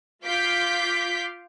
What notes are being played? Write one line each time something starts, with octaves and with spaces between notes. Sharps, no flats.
F4 F5 D6 G6 B6